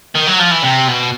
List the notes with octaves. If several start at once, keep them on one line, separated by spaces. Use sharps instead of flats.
D#3
F#3
F3
E3
C3
B2